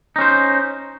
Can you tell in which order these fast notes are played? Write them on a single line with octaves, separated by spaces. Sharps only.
D#4 C#4 C5